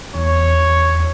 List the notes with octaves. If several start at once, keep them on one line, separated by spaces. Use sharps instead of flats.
E2 C#5